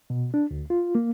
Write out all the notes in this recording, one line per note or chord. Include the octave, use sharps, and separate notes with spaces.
B2
D4
D2
F4
A#3